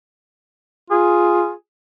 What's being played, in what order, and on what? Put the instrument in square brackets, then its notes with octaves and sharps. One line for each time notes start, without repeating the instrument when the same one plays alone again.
[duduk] F4 [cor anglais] G#4